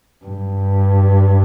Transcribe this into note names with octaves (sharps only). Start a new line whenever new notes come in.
G2